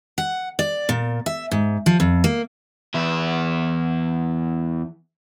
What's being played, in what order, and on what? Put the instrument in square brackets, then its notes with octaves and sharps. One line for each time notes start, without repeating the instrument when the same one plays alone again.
[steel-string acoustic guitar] F#5
D5
A#2
E5
G#2
F3
F2
A#3
[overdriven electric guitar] E2 E4